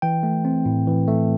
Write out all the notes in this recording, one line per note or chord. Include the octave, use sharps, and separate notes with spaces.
E3 G5
A3
C4
A2
E3
A3